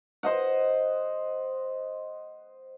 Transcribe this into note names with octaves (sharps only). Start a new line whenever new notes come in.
C5 D#5 F#5